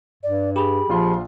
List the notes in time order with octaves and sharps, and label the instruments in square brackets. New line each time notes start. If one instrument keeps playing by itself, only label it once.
[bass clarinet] G2 [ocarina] D5
[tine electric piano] G4 G#4 [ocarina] B5
[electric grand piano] A#1 F4 C6 [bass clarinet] F3